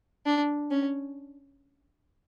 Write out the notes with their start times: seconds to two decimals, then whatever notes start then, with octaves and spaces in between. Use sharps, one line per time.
0.26 D4
0.71 C#4